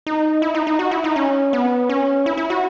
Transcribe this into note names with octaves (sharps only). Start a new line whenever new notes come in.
D#4
E4
D#4
D#4
F#4
E4
D#4
C#4
B3
C#4
E4
E4
F#4